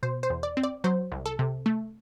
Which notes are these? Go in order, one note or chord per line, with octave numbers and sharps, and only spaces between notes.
B2 C5
C5
E2
D5
C4
D5
F#3 C5
C2
A4
C3
A3